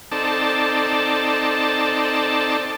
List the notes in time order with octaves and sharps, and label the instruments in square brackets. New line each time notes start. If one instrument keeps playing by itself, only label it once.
[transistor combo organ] C4 D#4 A4 D5 A5